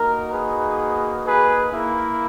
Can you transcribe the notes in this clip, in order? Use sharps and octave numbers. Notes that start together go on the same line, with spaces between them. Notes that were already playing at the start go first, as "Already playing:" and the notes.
Already playing: A#3 D#4 F#4 A#4
G#4 B4
G#4 B4
A#3 E4